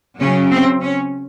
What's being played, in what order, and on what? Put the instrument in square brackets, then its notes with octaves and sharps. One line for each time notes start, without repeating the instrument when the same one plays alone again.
[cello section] C#3 F#3 C#4
C4
C#4